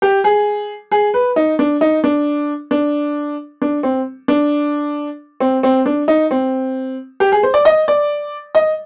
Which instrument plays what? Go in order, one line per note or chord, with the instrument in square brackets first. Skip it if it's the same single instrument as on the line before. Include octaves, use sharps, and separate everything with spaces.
[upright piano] G4
G#4
G#4
B4
D#4
D4
D#4
D4
D4
D4
C4
D4
C4
C4
D4
D#4
C4
G4
G#4
C5
D5
D#5
D5
D#5